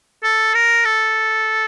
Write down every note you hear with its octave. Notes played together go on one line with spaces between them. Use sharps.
A4
A#4
A4